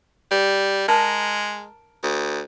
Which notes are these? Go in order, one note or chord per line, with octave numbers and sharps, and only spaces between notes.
G3
G#3 A#4 A5 A#5
D2